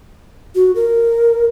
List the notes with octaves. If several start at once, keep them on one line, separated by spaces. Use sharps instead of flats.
F#4
A#4